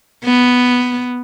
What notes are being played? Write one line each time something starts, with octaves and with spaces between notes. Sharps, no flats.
B3